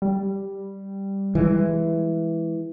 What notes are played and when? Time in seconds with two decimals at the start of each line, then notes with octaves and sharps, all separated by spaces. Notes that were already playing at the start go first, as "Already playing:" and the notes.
0.02 G3
1.35 E3 G#3